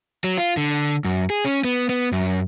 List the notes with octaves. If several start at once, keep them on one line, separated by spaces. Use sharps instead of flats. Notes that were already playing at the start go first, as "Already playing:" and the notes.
F#3
F4
D3
F#2
G#4
C#4
B3
B3
F#2